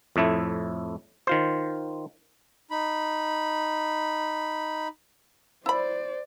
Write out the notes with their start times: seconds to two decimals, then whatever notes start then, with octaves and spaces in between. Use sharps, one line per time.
0.16 F2 A2 A3 E4
1.27 D#3 F4 C5
2.71 D#4 B5
5.66 E4 C5 D5 B5